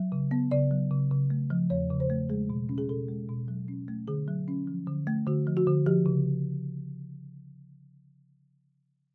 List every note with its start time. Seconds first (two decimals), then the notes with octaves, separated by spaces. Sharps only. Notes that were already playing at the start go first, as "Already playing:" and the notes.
Already playing: F#3
0.12 C#3
0.31 B3
0.51 C#3 D5
0.71 F#3
0.91 C#3
1.11 C#3
1.30 A3
1.50 F3
1.70 E2 C#5
1.90 C#3
2.00 C5
2.10 A3
2.29 G#3 G#4
2.50 B2
2.69 C#4
2.78 G#4
2.89 B2 A4
3.09 G#3
3.29 B2
3.48 F#3
3.68 C#4
3.88 A3
4.08 D3 G#4
4.28 F#3
4.48 C#4
4.67 F3
4.87 D3
5.07 A3
5.27 D3 F#4
5.47 F3
5.57 F#4
5.67 D3
5.86 F3 G4
6.06 C#3